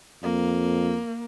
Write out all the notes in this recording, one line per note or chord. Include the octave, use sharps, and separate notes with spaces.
F2 A#3